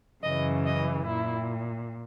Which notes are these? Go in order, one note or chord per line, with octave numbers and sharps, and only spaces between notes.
F#2 C#3 E3 D#5
D#5
A#2 E4